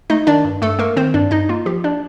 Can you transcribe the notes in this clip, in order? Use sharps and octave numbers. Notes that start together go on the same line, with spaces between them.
A3 D#4 D#5
D#3 D4 D5
G2
G2 A3 A4
A3 A#3 A#4
D#3 C4 C5
G2 D4 D5
G2 D#4 D#5
A#3 F4
F3 G4
D4 D5